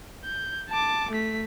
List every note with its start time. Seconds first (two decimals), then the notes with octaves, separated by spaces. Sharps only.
0.25 G6
0.70 A5 D6
1.11 A3 B6